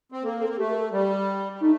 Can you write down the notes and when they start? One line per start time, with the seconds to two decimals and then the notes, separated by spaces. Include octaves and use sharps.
0.12 C4
0.23 A#3 A4
0.39 C4 A4
0.47 A#3
0.57 A3 G4
0.69 A#4
0.80 A4
0.91 G3 G4
1.52 G3
1.61 A3 D#4